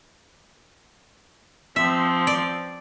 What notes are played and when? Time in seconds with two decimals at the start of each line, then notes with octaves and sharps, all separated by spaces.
1.76 F3 C4 E5
2.27 D5